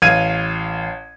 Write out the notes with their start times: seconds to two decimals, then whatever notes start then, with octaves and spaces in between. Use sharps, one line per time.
0.02 A1 F5 G#6 D#7